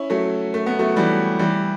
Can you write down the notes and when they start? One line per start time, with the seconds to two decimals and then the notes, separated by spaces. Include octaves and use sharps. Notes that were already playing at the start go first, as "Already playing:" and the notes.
Already playing: C#4 E4
0.10 F#3 A3
0.54 A3
0.66 B3
0.79 F#3 A3
0.96 E3 G3
1.39 E3 G3